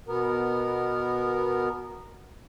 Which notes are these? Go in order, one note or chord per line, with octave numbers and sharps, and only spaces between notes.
B2 B3 A#4